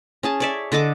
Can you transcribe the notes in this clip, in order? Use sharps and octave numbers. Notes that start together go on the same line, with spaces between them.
C#4 G#4 A5
C#5 D5 E5
D3 A4 D#5 D6